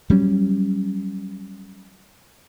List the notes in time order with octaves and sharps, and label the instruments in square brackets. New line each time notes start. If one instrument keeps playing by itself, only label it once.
[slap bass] F#3 G3 C#4